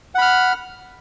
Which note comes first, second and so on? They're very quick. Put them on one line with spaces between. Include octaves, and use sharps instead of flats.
F#5 B5 F6